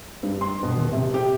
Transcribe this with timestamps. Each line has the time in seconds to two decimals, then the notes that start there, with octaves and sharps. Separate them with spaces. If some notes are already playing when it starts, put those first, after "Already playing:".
0.23 G2
0.41 C6
0.63 B2
0.77 D#1
0.93 C3
1.14 G4